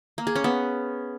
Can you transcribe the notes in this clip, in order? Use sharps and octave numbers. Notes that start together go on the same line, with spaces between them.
A#3
G#4
C#4
B3